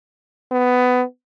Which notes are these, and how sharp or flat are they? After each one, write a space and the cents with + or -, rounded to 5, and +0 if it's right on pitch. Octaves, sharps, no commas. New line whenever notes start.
B3 +15